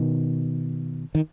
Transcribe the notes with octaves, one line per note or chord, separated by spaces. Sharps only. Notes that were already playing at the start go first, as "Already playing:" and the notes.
Already playing: B2 D#3
D#3